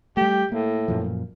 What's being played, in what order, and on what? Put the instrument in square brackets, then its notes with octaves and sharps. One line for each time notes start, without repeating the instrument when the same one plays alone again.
[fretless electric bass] G3 A3 [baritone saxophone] G4
[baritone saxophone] A2 [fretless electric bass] A#3
[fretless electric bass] F#2 A#2 F3